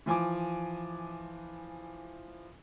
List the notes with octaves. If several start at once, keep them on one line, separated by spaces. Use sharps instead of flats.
E3 F3 G#5 D6